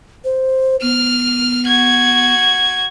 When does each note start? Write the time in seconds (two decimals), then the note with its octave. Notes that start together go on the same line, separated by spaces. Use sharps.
0.24 C5
0.82 B3 F6
1.67 F#4 G#6